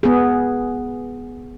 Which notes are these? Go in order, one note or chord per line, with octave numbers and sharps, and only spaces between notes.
B3 G#4